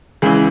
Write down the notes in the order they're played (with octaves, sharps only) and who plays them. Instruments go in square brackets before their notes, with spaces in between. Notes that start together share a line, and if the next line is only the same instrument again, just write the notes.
[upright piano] C#2 C#3 E3 G#4